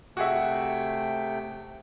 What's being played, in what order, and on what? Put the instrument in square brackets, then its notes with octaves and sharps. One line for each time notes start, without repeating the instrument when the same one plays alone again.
[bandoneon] C3 A3 G5 [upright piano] F#4 G#4 E5